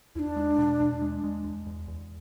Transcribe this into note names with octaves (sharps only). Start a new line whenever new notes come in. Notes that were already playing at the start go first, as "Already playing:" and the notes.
E2 D4 E4
G#3
B2
E2
G#3
G#3
E2
E2
E2